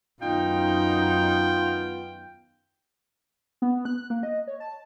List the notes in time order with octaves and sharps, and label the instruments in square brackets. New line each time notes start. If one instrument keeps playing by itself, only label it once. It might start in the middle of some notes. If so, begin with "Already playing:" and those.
[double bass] F#2 D#4 [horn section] D#3 B3 F4 [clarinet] G5
[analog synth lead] B3
F#6
A#3
D#5
C#5
A5